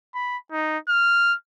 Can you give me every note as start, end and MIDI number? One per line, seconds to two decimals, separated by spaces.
0.15 0.37 83
0.52 0.78 63
0.89 1.35 89